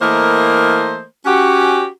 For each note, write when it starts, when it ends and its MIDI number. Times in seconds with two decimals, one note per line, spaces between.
0.02 1.04 52
0.02 1.04 57
0.02 1.04 58
0.02 1.04 70
0.02 1.04 72
0.02 1.04 75
1.26 1.88 61
1.26 1.88 66
1.26 1.88 67